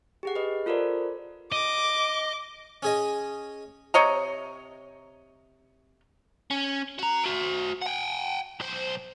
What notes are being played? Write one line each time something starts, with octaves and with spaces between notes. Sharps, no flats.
G4 G#4 F#5
B4 D#5
F4 A4 A#4 C5 D5
D#5 D6
C#4 G#4 D#5
C3 C#5 D#5 A#5
C#4
F#4 A#5
F#4 C5
F#5 G5
B1 C5